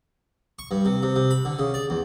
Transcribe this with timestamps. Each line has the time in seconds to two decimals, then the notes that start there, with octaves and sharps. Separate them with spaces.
0.59 C#6
0.71 G2
0.85 C3
1.03 C3
1.16 C3
1.31 B5
1.45 D3
1.59 C#3
1.74 D5
1.90 E2